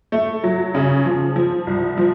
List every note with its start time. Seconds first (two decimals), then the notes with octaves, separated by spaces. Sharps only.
0.12 A3
0.44 F#3
0.74 C#3
1.05 F3
1.36 F3
1.67 C2
1.97 F3